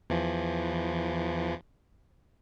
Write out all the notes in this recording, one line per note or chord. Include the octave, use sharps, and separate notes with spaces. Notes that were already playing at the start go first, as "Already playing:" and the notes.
E2 E3 F3